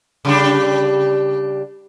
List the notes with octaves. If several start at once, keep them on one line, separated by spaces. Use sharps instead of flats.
C#3 G3 D4